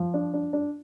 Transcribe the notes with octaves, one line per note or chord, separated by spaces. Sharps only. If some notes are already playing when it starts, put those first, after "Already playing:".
Already playing: F3
D4
D4
D4